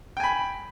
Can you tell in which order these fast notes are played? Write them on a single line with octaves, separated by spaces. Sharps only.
G5 G#5 B5